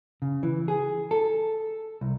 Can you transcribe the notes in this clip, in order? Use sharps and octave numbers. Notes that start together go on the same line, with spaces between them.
C#3
E3
G#4
A4
C2